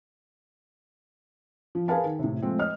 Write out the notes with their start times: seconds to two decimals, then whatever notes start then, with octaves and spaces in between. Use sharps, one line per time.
1.75 F3
1.88 G#4 A#4 B4 F5 A5
2.04 D#3
2.19 A2 C3
2.42 F3 G#3 A3 C4
2.59 D#5 F6